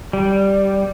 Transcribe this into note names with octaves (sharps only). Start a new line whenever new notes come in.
G3